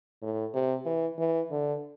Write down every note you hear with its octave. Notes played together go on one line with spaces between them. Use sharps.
A2
C3
E3
E3
D3